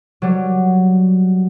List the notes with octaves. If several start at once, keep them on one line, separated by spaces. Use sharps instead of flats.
F#3 G3